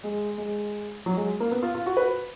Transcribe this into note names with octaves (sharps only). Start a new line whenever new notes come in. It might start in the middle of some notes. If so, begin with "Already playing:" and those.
G#3
G#3
F#3
G#3
A#3
B3
F4
F4
F#4
B4